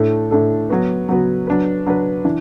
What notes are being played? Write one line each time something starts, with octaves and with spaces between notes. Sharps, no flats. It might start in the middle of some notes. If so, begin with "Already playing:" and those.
Already playing: A2 A3 D4 A4
A2 A3 D4 A4
F#3 B3 F#4 B4
F#3 B3 F#4 B4
F#3 D4 B4
F#3 D4 B4
E3 D4